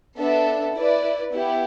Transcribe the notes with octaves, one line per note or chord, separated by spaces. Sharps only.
B3 D4 A4 E5
E4 B4 D5
B3 E4 G4